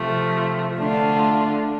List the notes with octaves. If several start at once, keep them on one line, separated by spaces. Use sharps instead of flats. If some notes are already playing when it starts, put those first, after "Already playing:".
Already playing: C3 F3 A3
D3 A3 D4 F4